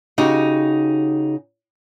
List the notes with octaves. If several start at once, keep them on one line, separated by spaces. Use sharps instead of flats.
C#3 D#4 F#4 G4